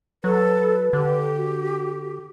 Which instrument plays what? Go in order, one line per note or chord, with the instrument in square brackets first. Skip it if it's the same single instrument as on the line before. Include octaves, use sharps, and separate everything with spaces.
[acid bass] F#3 [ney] A4 [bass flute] B4
[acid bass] D3 [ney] G4
[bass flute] F#4